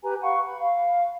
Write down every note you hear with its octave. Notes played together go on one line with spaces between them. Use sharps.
G4 B4 G#5 A#5
F5 F#5 B5 C#6
B5
F5